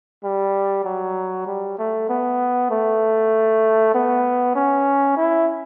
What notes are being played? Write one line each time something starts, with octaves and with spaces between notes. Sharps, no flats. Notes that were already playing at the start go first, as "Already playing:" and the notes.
G3
F#3
G3
A3
B3
A3
B3
C#4
E4